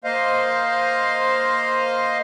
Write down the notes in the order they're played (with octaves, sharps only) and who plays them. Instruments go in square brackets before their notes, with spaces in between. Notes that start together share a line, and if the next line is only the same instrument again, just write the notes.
[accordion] A#3 C5 D#5 F5